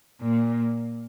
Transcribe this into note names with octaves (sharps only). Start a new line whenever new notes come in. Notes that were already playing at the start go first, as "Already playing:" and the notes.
A#2